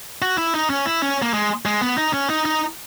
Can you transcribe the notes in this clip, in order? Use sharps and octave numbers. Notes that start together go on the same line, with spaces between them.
F#4
E4
D#4
C#4
E4
C#4
A#3
G#3
G#3
B3
D#4
C#4
D#4
D#4